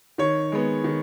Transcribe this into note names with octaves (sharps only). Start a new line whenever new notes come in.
D#3 C#5
G#3 B3
D#3